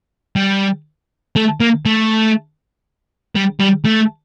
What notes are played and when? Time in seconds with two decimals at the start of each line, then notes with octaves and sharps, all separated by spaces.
0.36 G3
1.36 A3
1.60 A#3
1.85 A3
3.35 G3
3.60 G3
3.85 A3